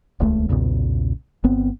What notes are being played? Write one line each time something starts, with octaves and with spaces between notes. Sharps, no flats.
D#1 C#2 A3
B1 E2 A#2 C#3
G1 B3 C4